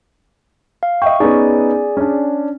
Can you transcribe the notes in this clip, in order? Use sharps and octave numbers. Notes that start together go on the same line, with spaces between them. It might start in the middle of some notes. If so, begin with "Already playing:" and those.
F5
D#5 E5 G5 C#6
B3 C#4 D#4 G#4 D5 G#5
C#4 D4